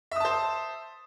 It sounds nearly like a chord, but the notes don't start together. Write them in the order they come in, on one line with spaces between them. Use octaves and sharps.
E5 D#6 A5 C5